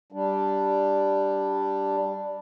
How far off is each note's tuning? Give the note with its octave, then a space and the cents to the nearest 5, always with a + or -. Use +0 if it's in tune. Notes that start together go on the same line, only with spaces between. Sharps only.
G3 +0 D4 +0